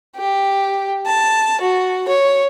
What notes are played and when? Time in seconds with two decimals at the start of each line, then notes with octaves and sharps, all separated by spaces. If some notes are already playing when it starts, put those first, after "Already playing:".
0.16 G4
1.06 A5
1.61 F#4
2.08 C#5